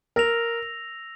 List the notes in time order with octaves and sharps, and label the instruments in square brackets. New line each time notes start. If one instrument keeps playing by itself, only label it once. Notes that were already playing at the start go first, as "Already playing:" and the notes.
[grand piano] A#4 [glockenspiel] E6 A#6 F7